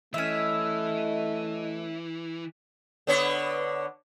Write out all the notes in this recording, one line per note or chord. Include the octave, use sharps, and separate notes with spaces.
E3 A3 C#4 D#5 E5
D3 B3 C#5